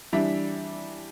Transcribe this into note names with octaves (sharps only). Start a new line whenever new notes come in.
E3 G3 D4 E5